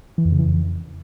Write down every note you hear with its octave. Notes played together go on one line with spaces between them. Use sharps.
E3
F2
C#3
E3
F2